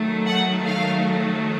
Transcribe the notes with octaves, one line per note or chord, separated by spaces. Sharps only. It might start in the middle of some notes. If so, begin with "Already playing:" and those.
Already playing: D#3 F#3 A3
F#5
F5